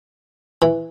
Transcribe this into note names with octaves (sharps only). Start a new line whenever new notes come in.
E3